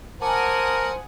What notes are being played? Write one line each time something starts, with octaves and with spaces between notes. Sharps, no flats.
A#4 C5 F#5 G#5 A5 D6 D#6